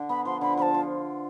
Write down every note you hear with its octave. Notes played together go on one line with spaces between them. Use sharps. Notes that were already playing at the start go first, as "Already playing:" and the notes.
Already playing: D3 D4
B3 B5
F3 C6
D3 B5
F3 A5 B5
F4